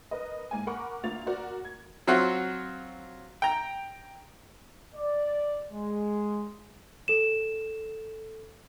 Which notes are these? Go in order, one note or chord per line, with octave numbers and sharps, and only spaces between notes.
A#4 B4 D#5
G#2 A#3 G#5
A#4 F#5 B5 C#6 D6
D2 A#3 F4 A6 F7
F#4 A#4 D5
G#6
F#3 C4 F4 F#4
G5 A#5
D5
G#3
A4 E7